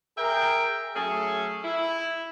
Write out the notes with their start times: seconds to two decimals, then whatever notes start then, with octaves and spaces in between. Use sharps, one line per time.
0.17 G#4 A#4 E5 G5
0.95 F#3 A3 C#4 G#4 A4
1.64 E4